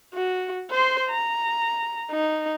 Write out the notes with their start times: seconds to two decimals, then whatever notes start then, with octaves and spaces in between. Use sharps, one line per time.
0.14 F#4
0.70 C5 C6
1.10 A#5
2.11 D#4